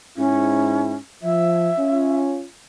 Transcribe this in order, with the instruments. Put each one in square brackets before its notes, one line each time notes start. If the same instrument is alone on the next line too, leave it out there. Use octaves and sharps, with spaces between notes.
[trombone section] G#2 E4 [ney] C#4
[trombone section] F3 [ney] E5
[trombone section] C#4 F4